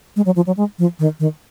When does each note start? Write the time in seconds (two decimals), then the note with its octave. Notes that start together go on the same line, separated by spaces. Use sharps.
0.16 G#3
0.26 F#3
0.36 F3
0.47 F#3
0.57 G#3
0.79 F3
0.99 D#3
1.20 D#3